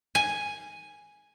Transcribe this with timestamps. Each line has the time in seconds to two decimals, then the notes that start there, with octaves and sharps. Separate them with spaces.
0.15 G#5